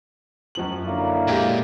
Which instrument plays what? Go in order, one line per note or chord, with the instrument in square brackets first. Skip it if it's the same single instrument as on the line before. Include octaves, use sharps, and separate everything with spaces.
[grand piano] F#2 F3 F#7
[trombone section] D3 F#3 E4 [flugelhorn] A#3
[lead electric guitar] A#2 [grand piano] G#3 G4